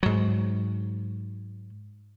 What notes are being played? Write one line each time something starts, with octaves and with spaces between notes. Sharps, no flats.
G#2 F#3